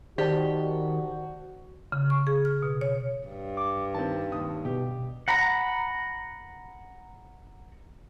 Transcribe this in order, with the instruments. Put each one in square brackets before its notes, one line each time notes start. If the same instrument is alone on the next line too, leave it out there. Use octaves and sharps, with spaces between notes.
[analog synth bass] D#3 [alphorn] F#4 [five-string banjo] G4 [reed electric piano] C5 D5 A5
[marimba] C#3
C#6
G#4
F6
B2
C#5
[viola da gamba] G2
[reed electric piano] D6
[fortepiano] D#3 C4 [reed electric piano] A5
[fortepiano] D#2 D#6
[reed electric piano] B2 [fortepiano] G4
[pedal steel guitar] F#5 A#5 B5